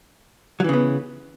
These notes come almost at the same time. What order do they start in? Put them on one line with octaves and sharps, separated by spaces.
F#3 E3 C#3 B3